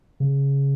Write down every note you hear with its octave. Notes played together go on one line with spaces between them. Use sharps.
C#3